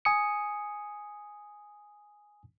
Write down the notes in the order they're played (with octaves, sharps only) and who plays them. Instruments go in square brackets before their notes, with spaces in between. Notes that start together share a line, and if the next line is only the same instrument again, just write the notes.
[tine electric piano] G#5 D#6 C#7